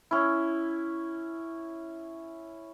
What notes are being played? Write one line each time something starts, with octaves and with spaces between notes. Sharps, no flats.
C#4 E4